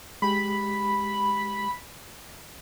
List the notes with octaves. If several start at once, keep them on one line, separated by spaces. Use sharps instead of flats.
G#3 G4 B5